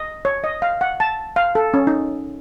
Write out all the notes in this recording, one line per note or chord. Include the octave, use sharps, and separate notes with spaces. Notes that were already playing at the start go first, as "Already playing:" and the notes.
Already playing: D#5
C#5
D#5
F5
F#5
A5
F5
A4
C#4
D#4